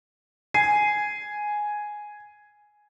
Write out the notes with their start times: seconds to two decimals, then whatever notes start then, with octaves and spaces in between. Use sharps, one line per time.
0.54 G#5 C7